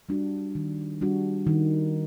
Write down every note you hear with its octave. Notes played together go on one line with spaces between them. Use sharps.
G3 D4 F#4
D#3
G3 D4 F#4
D#3